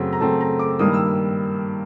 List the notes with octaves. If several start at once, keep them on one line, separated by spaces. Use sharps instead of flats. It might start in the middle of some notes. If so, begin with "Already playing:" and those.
Already playing: F#2 C#3 F#3 A3 C4
A#5
F#2 C#3 F#3 A3 C4 A5
A#5
D6
G2 D#3 G3 A#3 D#6
E6